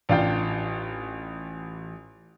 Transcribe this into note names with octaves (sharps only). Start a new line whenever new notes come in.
A1 D4 F4 F5 G5 G6